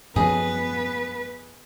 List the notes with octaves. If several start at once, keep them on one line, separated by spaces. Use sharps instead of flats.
F#2 F3 B3 G#4 B4 D#5